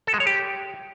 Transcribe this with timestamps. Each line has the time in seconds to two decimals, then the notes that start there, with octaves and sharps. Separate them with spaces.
0.07 A4
0.14 G#3
0.20 C#5
0.27 G4